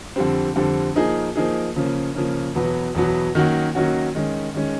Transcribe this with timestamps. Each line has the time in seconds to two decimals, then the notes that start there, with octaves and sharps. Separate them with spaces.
0.16 F2 D3 G3 C4
0.56 F2 D3 G3 C4
0.96 F3 A#3 D#4 G#4
1.36 F3 A#3 D#4 G#4
1.76 C#3 F3 A#3 C#4
2.15 C#3 F3 A#3 C#4
2.55 E2 B2 F#3 B3
2.95 E2 B2 F#3 B3
3.35 D#3 F#3 A#3 C#4 F#4
3.75 D#3 F#3 A#3 C#4 F#4
4.15 D#3 G#3 C#4
4.55 D#3 G#3 C#4